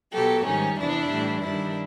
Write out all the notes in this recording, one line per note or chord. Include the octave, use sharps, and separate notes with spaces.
B2 F#3 G4 A4
G#2 D#3 G3 C#4 D#4
F2 C3 E3 D4 E4
A2 E3 G3
G2 D#3 G3 D4 E4